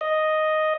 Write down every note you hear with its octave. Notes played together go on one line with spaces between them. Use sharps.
D#5